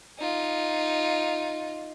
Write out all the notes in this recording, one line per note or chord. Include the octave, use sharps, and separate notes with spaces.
D#4 F4